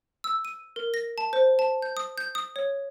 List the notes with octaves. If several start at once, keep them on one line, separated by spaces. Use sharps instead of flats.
E6
D#7
A#4
A#6
A5
C5
A5
G6
D#6
G6
D#6
C#5